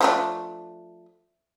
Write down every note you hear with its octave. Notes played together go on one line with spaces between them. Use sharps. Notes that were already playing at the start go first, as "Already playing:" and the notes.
F3 A3 D4